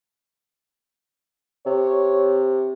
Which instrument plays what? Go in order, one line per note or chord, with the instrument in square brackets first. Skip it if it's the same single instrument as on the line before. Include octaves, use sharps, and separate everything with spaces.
[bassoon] C3 [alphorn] C#5